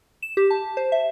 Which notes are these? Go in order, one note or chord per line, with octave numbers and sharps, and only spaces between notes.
E7
G4
A5
C5
E5